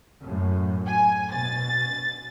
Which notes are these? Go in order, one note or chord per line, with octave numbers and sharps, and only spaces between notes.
F#2 A2
G#5
B2 A6